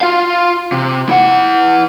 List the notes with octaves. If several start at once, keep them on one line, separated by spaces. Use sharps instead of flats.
F4 F5
C3
E4 F#5